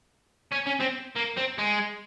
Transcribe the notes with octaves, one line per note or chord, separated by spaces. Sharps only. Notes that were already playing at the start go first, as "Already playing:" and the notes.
C#4
C#4
C4
A#3
C4
G#3